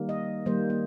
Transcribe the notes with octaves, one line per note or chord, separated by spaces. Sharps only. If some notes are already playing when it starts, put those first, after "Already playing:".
Already playing: D#3 G3 A#3
D#5
D#3 G3 A#3 C5
A#3